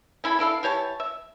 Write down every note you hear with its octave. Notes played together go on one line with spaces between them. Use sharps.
C#4 E4 A4 B5
D4 E4 A4 F5
E3 G4 C#5 A5
E5